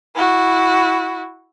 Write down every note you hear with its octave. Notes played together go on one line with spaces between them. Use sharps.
E4 F#4